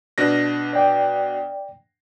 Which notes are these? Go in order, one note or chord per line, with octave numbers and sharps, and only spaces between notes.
B2 D4 A#6
D5 G5